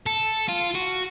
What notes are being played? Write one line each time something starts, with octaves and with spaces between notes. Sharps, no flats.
A4
F4
F#4